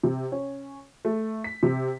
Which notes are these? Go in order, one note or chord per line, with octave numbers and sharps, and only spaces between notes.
C3
C#4
A3
B6
C3